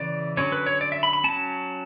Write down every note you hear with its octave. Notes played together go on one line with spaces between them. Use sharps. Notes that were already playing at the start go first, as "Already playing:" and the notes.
Already playing: C#3 E3 D5
D3 F#3 C#4 C#5
B4
C#5
D5
E5
B5
B5
F#3 C#4 A5